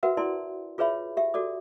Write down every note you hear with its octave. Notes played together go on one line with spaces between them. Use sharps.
F#4 A#4 B4 E5 F#5
E4 A#4 D5 A5 C6
F4 G#4 B4 C#5 E5 B5
G4 E5
F#4 A4 D5 D6